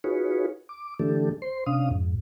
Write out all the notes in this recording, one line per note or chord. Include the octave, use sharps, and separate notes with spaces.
D#4 F4 F#4 G#4 B4 C#5
D6
D3 E3 A3 D4 G4 A4
C5 C6
C3 C#4 D4 F5 D#6
F2 G#2